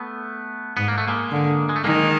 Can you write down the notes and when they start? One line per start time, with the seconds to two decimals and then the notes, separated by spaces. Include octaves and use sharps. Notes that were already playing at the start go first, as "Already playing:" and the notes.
Already playing: A3 B3
0.77 G#2 B3
0.88 A#3
0.98 A3
1.08 G#3 A#3
1.31 D3
1.69 G#3
1.76 A3
1.84 D#3 G#3 A#3